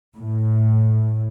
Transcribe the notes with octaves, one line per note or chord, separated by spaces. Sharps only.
A2